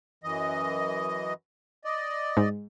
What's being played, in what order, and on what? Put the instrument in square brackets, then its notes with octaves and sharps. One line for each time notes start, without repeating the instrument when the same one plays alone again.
[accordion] F#2 E3 D#5
D5 D#5
[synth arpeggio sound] G#2